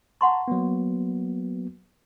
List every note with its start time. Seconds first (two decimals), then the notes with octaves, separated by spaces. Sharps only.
0.21 F#5 A5 A#5 C6 C#6
0.48 F#3 A#3 B3